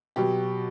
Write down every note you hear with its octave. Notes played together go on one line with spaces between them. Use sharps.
B2 F#3 G4